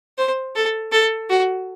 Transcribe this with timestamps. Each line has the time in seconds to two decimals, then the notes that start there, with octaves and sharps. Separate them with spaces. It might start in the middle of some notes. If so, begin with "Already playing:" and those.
0.18 C5
0.55 A4
0.92 A4
1.30 F#4